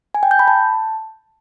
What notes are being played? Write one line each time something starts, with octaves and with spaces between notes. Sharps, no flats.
G#5
G5
G6
B5
A5